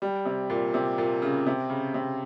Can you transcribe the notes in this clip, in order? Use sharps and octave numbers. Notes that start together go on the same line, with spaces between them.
G3
C3
A#2
C3
A#2
C#3
C3
C#3
C3